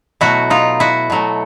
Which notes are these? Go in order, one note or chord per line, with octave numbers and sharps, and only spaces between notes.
B2 F#3 A3 E4 F#4
D#4 F4
E4 F#4
B2 F#3 A3